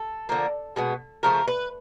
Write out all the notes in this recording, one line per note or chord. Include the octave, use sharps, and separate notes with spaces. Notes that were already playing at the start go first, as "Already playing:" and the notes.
Already playing: A4
D3 F3 A#3
B2 G#3 B3
C#3 F3 A3 A#4
B4